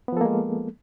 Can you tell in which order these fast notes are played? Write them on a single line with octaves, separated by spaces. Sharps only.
B3 F3 A4 A#3 G#3